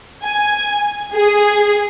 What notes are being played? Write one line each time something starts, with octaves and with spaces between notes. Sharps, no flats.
G#5
G#4